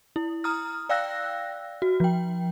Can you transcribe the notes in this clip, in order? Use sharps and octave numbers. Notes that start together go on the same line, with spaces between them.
E4
A#5 D#6 F6
D5 F5 G5 E6 F#6 A#6
F#4
F3 G5